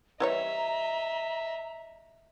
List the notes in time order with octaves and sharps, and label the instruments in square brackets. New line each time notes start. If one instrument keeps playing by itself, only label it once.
[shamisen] E3 G3 C#5 [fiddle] D#5 E5 [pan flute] A#5